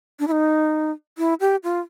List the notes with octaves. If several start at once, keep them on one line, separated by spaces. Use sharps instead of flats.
D4
E4
D#4
E4
G4
F4